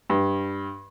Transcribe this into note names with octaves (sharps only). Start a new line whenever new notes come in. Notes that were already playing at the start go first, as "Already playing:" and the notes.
G2